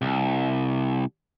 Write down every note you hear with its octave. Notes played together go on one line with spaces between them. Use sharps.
C2